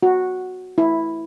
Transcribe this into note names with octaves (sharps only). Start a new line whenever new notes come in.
F#4
E4